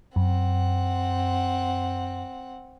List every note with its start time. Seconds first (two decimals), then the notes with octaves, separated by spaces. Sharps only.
0.16 F#2 C4 F#5